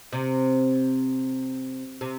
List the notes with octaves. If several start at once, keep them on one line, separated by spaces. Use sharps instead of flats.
C3
C3